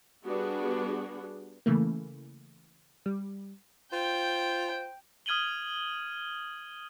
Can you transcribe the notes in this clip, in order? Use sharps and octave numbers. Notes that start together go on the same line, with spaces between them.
G3 B3 D4 F#4 G#4
C#3 E3 A3 A#3
G3
F4 C5 G5
D#6 F6 G#6 D#7 F#7 G7